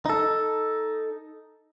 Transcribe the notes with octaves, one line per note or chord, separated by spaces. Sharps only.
D#4 A4